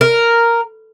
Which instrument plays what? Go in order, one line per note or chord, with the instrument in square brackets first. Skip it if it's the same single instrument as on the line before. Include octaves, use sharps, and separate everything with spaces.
[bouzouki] A#4